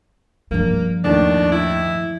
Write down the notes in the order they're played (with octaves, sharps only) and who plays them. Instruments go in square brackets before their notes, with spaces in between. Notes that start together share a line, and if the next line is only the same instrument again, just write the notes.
[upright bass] G2 F3 [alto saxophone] A#3
[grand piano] D#2 A2 [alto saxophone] D4
[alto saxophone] E4